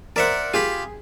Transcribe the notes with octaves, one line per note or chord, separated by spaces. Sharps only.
A#4 C5 D5 E5 F#5
F4 G4 G#4 B5